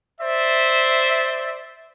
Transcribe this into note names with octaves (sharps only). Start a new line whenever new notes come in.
C5 D5 E5